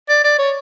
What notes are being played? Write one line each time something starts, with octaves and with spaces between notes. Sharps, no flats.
D5
D5
C#5